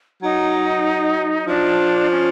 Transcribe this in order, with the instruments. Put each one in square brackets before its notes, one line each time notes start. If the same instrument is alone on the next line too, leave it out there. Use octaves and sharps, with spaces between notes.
[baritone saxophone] F#3 [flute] D#4
[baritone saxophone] F3 [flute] D4
[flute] C#4